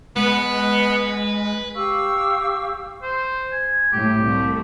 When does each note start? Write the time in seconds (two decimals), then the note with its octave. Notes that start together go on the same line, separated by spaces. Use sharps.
0.16 G#3 B3 B4
1.75 G4 F5 C#6 E6
3.02 C5
3.52 G#5
3.92 A2 G4
4.23 C2 A3